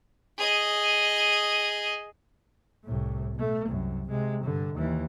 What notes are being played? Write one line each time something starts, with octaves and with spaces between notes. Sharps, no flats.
G#4 D#5
C2 A2
B2 A3
C2 F#2
C3 G#3
G2 D3
D#2 E3